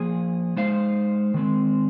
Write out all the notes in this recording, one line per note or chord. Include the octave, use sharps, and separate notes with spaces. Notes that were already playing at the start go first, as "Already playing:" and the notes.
Already playing: F3 A#3 G#4
G#3 D#4 C5 F5
D#3 G#3 C4